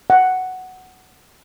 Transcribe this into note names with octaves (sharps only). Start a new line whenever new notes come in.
F#5